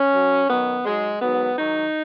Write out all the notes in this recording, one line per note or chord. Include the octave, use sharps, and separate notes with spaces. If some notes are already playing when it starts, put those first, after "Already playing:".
Already playing: C#4
F#2 F#3
F#2 D#3 F#3 B3
G#2 F#3 G#3
G#2 D#3 F#3 B3
G#2 D#3 F#3 D#4